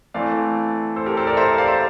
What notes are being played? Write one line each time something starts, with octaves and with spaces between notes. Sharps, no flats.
E3 A3 C4 D5 F5
A4 C5
G4 A#4
A4 C5
A#4 D5
C5 E5
C5 E5
D5 F5
C5 E5